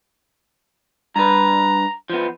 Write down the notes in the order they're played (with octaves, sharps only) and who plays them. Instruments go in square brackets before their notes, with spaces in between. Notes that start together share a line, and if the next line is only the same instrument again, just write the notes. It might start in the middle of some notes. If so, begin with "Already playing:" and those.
[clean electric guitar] G2 B4 [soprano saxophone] A#5
[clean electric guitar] F3 B3